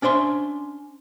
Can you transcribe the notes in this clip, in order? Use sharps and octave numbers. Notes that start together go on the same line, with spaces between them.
C#4 D4 C5 E5 C6